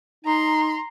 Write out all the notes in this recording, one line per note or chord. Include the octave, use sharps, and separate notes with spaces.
D#4 A#5 C6